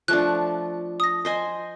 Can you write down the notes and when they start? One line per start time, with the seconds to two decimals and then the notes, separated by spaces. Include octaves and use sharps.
0.08 F3 A3 D4 F#6
1.00 D#6 A#6
1.25 C5 D#5 G#5